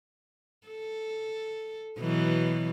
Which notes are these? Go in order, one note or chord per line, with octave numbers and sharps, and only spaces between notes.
A4
B2 E3 F#3